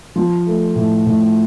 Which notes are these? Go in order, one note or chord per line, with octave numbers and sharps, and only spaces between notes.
F3
A3
A2
A2